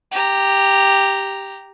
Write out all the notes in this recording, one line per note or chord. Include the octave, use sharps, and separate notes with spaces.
G4 A#5